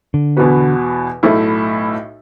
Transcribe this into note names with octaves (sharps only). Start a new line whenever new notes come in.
D3
E2 B2 B3 F#4 B4
B1 A2 A3 E4 A4